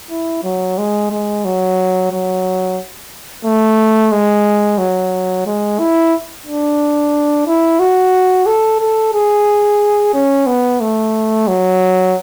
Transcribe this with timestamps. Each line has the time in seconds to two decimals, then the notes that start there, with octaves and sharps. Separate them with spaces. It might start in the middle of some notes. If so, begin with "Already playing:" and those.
0.11 E4
0.43 F#3
0.78 G#3
1.11 G#3
1.45 F#3
2.11 F#3
3.45 A3
4.12 G#3
4.78 F#3
5.46 G#3
5.79 E4
6.46 D4
7.47 E4
7.80 F#4
8.46 A4
8.80 A4
9.13 G#4
10.14 C#4
10.47 B3
10.81 A3
11.48 F#3